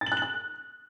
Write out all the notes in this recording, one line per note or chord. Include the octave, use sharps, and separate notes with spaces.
A6
F#7
F#6
F#7
F#6